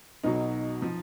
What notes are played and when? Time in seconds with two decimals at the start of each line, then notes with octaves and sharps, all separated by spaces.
0.23 B1 B2 F#3 D#4
0.82 F3